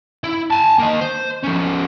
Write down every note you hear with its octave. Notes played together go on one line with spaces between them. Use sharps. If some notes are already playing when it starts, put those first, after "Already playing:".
E4
G#5 A5
A#3 D#5
C5
F3 C#4